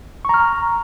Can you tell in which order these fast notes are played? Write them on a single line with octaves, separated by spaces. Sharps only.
C#6 A#5 F6